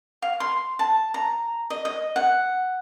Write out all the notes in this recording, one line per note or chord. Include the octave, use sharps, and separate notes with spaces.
F5
C6
A5
A#5
D#5
D#5
F#5